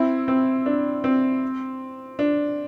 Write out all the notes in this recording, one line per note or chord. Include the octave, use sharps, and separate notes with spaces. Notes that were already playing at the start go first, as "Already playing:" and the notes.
Already playing: C4 E4
C4
D4
C4
D4